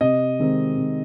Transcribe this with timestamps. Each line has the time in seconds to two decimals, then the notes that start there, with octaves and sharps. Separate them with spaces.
0.01 C3 D#5
0.39 D#3 G#3 C4 D#4
0.77 C3